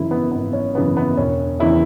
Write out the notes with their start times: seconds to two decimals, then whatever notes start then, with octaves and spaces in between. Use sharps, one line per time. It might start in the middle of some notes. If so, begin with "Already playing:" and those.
Already playing: G#1 F#2 C#3 E3 E4
0.11 B3
0.31 G#1 B3
0.53 C#4
0.75 F#2 C#3 E3 B3
0.97 B3
1.17 E1 C#4
1.60 E2 C#3 E3 E4